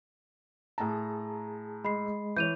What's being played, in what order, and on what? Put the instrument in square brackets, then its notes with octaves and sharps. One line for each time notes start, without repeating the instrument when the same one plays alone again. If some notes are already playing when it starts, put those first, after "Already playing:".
[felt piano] A2 A#5 [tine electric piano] G#4 A5
[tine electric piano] G#3 [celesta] B5 C7
[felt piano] E3 C#5 [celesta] G6 D#7 F7